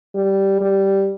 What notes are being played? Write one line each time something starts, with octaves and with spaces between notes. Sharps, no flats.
G3
G3